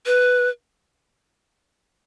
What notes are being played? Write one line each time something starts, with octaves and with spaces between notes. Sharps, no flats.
B4